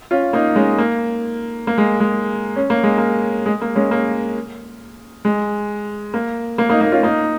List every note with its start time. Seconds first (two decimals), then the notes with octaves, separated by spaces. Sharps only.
0.11 C#4 F4
0.33 A#3 D#4
0.55 G#3 C#4
0.78 A#3
1.67 A#3
1.78 G#3
2.00 G#3
2.56 C#4
2.70 A#3
2.83 G#3
2.98 A#3
3.46 G#3
3.61 A#3
3.75 G#3 C#4
3.91 A#3
5.25 G#3
6.14 A#3
6.58 A#3
6.69 A#3 D#4
6.81 A#3 D#4
6.92 C#4 F4
7.03 A#3 D#4